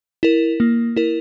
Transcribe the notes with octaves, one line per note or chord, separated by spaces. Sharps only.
E4 A#4
A#3
E4 A#4